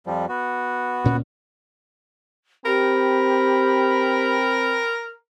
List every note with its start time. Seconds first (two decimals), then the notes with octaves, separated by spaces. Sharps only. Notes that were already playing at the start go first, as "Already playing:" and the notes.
0.07 F2 F3 G3
0.29 B3 F#4
1.04 D2 A#2 C#4
2.66 C4 G4 A#4 G5 B5